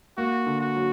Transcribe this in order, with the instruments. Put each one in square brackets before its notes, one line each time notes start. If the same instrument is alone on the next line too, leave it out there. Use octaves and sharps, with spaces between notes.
[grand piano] A#3 [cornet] F#4
[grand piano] D3
[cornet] F#4
[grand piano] F#3